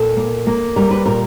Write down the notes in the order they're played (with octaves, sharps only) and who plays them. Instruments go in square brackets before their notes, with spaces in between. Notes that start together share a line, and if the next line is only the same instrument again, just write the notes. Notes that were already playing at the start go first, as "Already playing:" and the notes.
Already playing: [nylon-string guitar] A#2 A4
A#3
A#3
G3 A#4
B4
A#2 A#4